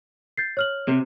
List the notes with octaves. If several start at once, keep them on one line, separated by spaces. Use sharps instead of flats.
G6 A6 C7
C#5 F6 F#7
C3